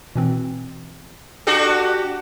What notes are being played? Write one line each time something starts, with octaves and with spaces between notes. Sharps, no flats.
B2 E3 C4
D4 F#4 G4 A4